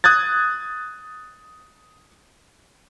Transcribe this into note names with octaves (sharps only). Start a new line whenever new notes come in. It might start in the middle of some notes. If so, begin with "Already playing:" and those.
D#6 F#6 G#6 A6